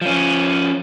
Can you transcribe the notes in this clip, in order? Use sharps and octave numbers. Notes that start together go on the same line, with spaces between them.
F3 C#4